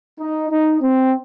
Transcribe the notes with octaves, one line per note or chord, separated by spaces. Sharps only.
D#4
D#4
C4